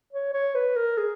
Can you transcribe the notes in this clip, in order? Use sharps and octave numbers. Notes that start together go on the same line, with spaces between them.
C#5
C#5
B4
A#4
G#4